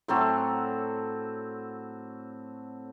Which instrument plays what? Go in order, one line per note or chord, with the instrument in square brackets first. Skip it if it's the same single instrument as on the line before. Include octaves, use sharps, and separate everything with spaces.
[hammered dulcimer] A2 F#3 C4 A4